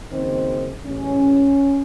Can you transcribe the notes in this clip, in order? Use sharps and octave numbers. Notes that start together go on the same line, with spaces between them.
F#1 F#2 D#3 C4
A1 A2 G#3 C#4